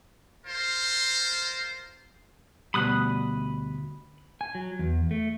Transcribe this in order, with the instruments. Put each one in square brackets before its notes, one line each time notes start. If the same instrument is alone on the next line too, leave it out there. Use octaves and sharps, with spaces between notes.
[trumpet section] F4 A#4 C5
[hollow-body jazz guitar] D2 B2 G3 [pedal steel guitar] B5 D#6 F#6
[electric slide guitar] G#5
F#3
E2
A3